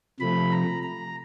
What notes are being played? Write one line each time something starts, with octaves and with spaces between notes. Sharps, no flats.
C3 F3 A3 B5
A#5
A#5